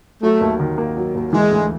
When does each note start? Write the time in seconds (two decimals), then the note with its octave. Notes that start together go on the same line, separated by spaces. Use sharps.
0.22 F#3 A3
0.41 D#2
0.60 D#3
0.78 A#3
0.97 F#3
1.15 D#2
1.33 E3 G#3
1.51 D2